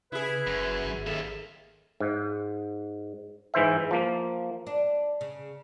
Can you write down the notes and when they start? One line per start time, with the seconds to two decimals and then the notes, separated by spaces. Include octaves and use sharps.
0.12 C#3 E4 G#4 B4
0.47 F#1 F#2
0.85 G#1
1.07 D#2 A#3 A4 E5
2.00 G#2
3.54 G#2 E3 C5 E5
3.91 F3 A#3
4.67 D4
5.21 C#3